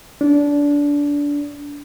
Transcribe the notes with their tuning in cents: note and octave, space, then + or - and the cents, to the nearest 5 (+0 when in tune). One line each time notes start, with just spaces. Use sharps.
D4 -20